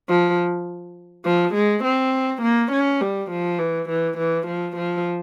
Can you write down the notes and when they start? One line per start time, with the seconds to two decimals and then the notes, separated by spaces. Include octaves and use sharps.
0.09 F3
1.25 F3
1.54 G#3
1.84 C4
2.42 A#3
2.72 C#4
3.01 G3
3.31 F3
3.59 E3
3.89 E3
4.18 E3
4.47 F3
4.77 F3